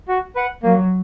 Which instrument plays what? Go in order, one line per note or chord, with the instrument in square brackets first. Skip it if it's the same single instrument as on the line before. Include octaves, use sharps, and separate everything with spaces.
[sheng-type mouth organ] F#4
B4 F#5
[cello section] F#3 [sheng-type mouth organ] A#3